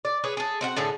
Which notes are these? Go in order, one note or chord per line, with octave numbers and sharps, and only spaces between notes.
D5
G#4 B4 C#5
G#4 A4
C4 F#4 F#5
A2 D3 G#4 A4